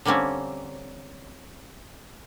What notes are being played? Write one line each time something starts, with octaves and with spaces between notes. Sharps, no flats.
D3 G3 A#3 C4 C#4